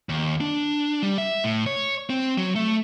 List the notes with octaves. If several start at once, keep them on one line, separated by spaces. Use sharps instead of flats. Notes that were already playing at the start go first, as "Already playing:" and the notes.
D#2
D4
G3
E5
A2
C#5
C4
F#3
A3